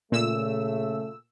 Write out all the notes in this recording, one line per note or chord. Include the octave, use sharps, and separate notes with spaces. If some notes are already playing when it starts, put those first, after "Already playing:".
A#2 C#3 A3 E6